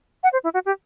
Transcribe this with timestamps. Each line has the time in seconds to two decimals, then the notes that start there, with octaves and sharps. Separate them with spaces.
0.23 F#5
0.33 C5
0.44 E4
0.54 F#4
0.66 G4